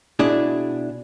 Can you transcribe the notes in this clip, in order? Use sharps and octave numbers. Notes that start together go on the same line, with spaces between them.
B2 D4 E4 G#4